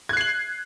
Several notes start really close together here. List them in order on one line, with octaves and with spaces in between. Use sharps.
G#6 F#6 C7 F#7